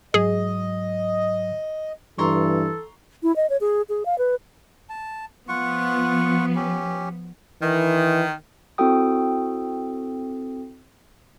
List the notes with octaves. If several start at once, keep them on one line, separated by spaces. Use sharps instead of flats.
G#2 F#3 G#4 D#5
G2 E3 A4 A#5 C6 C#6
E4
D#5
C#5
G#4
G#4
F5
B4
A5
F3 B3 F4 F#5 C#6
C#4 G4
D#3 E3
C4 E4 F#4 A4 G5 D#6